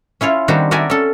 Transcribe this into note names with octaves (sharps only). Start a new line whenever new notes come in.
C#4 E4 F4 C#5
D#3 G3 C4 D4 F#4 G4
F#4 A#4 D5 E5 G#5
C#4 A4